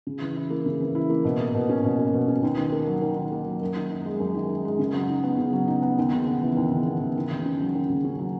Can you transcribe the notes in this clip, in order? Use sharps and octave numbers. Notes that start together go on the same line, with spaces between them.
C#3
E3
E4
A#3
C#3
E3
E4
A#3
B2
A#3
B2
C#4
B2
A#3
B2
C#4
D#2
D#3
A#3
F#3
D#2
D#3
A#3
F#3
F#2
D#3
D#4
G#3
F#2
D#3
D#4
G#3
C#3
F#3
D#4
B3
C#3
F#3
D#4
B3
D#2
C#3
B3
E3
D#2
C#3
B3
E3
D#2
C#3
C#4
F#3
D#2
C#3
C#4
F#3